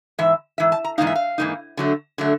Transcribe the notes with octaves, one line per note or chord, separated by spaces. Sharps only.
G#2 E3 E5
G#2 E3 E5
A5
A#5
G#2 E3 G3 A#3 D#4 F5
E5
F5
G#2 E3 G3 A#3 D#4
D3 F#3 A3
D3 F#3 A3